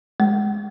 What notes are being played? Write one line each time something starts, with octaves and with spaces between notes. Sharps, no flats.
G#3